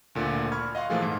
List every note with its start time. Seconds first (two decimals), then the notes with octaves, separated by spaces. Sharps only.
0.15 D2 A#2 D3
0.52 B5 C#6 F6 G#6
0.75 D#5 F5 F#5 C6
0.90 A#2 E3 F3 A3 F4 G#4
1.02 G#2